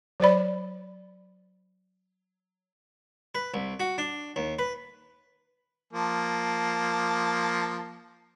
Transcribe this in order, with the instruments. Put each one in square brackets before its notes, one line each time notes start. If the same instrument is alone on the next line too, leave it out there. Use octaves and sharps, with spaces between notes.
[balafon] F#3 C5 D5 B5
[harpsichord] B4
C2
F#4
D4
D#2
B4
[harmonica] F3 A#3 A5